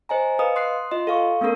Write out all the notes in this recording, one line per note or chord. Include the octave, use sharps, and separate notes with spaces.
C5 D#5 G#5 A#5
B4 D#5 F5 D#6
C6 D#6 F#6 C7
F4 D#5 C6
A4 F5 C#6
A3 B3 C#4 A4 A#4